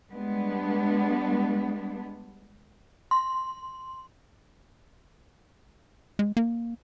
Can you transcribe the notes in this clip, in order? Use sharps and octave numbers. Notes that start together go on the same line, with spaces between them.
G3 G#3 B3 D4
C6
G#3
A#3